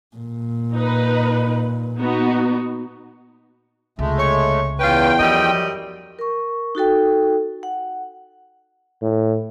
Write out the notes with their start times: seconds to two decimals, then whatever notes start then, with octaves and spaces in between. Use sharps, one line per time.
0.16 A#2
0.74 D#4 B4
1.98 B3 D#4 F#4
3.99 C#2 C3 G#3 A3
4.19 C#5
4.80 E2 C#4 F4 B4 G5
5.20 F#2 F3 G3 D#5
6.19 A#4 C#6
6.75 D#4 F#4 A4 G5
7.63 F#5
9.02 A2